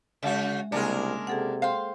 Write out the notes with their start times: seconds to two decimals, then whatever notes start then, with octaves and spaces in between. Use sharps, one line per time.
0.23 C#3 G#3 F#4 E5
0.72 C2 C#3 G#3 A#3 D4 A#4
1.27 C3 G#4 A4 F#5
1.62 C5 F5 G5 C6